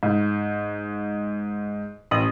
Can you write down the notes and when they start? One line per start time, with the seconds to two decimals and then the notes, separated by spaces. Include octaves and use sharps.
0.03 G#2
2.11 A1 D#6 F#7